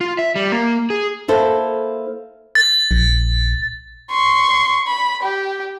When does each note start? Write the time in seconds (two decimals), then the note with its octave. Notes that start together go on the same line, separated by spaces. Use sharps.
0.01 F4
0.19 E5
0.36 G3
0.52 A#3
0.90 G#4
1.28 A#3 E4 A4 C5
2.55 A6
2.91 A#1
4.11 C6 C#6
4.87 B5
5.23 G4